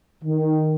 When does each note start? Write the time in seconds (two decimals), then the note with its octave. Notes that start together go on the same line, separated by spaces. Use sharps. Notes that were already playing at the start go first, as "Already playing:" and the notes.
0.23 D#3